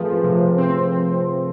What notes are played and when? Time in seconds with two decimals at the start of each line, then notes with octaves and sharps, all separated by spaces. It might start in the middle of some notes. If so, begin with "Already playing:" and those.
Already playing: F3 A3 C4 F4 G#4 A4 B4
0.24 C3
0.58 C4